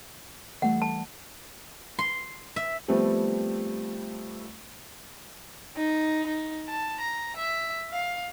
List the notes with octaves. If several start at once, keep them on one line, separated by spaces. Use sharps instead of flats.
E3 G3 A3 F#5
A5
C6
E5
F3 G3 A3 B3 C4
D#4
D#4
A5
A#5
E5
F5